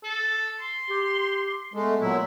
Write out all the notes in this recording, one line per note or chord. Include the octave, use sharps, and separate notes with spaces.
A4
C6
G4
G#3 A3 B3
A#2 F#3 E4